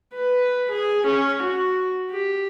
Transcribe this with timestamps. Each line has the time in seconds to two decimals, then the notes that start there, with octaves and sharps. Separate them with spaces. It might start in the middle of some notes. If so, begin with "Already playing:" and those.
0.14 B4
0.71 G#4
1.07 C#4
1.43 F#4
2.10 G4